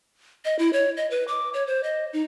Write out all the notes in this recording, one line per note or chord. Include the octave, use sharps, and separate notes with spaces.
D#5
E4
C#5
D#5
B4
D6
C#5
C5
D#5
D#4